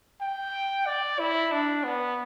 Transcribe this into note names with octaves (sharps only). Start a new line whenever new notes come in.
G5
D5
E4
D4
B3